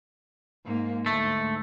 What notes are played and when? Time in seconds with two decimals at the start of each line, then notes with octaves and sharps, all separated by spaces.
0.65 G#2 A#3
1.06 D2 G#2 A3